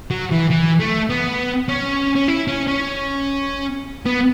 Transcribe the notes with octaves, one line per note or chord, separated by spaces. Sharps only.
F#3
E3
E3
A3
B3
C#4
C#4
E4
C#4
C#4
B3